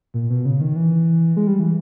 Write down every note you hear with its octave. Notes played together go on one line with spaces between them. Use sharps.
A#2
B2
C#3
D#3
E3
G#3
G3
E3